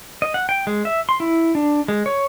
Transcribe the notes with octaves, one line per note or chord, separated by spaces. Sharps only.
D#5
F#5
G5
G#3
E5
C6
E4
D4
G#3
C#5